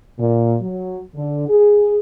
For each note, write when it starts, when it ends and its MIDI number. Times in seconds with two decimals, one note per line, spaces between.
0.18 0.55 46
0.62 1.01 54
1.15 1.45 50
1.49 1.99 68